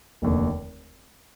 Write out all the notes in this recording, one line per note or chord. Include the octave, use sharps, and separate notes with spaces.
F1 D#2 D3